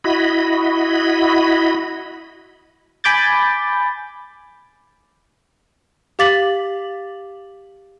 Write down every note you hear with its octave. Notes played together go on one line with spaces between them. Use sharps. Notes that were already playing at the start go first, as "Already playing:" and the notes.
E4 F#4 D#5 B5
G#5 B5 D6 G6 A6
G4 F5 D6 A6 B6 F#7